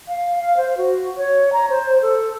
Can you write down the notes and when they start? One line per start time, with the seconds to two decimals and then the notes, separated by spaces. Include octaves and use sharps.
0.08 F5
0.40 F5
0.57 C5
0.77 F#4
1.17 C#5
1.53 A#5
1.70 C5
2.02 A4